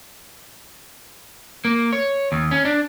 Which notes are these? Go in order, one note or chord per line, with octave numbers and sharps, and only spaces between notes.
A#3
C#5
D#2
C#4
D4